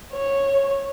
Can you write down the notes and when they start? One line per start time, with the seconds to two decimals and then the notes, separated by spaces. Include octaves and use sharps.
0.13 C#5